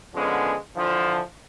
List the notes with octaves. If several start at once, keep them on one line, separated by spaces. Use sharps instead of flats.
D3 F3 G#3 B3 C#4
D3 E3 F3